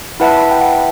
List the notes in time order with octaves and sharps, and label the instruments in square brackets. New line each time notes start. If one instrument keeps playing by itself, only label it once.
[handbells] E4 B4 E5 A5 [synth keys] F#5
[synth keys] G5
F#5